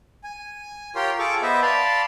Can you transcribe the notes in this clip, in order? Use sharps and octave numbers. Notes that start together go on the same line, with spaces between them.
G#5
F4 G4 A#4 C#5 G5 C6
F4 G#4 A4 C#6 D6
B3 B4 C5 D#5 E5
D5 F5 A5 B5 C6